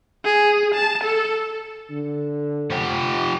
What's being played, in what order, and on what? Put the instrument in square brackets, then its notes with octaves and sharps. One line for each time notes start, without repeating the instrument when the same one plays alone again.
[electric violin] G#4
A5
A4
[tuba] D3
[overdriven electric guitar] F3 G4